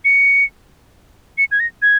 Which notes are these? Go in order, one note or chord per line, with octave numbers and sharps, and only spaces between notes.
C#7
C#7
G#6
A#6
G#6